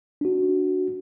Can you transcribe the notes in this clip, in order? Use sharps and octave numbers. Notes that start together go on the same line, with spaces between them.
D4 F#4